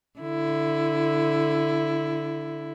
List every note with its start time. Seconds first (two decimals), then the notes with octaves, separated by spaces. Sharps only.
0.20 D3 E4